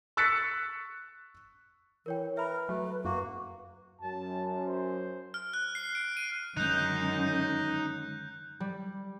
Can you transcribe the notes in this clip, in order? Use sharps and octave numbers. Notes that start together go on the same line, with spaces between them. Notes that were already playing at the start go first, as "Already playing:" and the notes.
C#6 E6 F#6 A6 B6 C#7
E3 A#4 C#5 G5
A#4 B4 E5 B5
F#3 A3
F#2 A#3 F#4
F#2 A5
C5
F6
F#6
C7
D7
D#7
F#2 D3 D#3 G#3 D#4 F#6 G6
G3